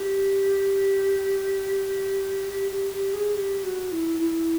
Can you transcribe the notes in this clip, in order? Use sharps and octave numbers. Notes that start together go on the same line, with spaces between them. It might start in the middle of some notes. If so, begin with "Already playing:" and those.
Already playing: G4
G4
G4
G4
G#4
G4
F#4
E4
E4